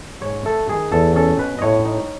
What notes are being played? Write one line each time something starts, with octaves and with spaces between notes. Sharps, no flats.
G#2 C#5
A3 A4
D#3 G#4
E2 A4
C#4 A4
B2 B4
D#5
A2 C#5
D#4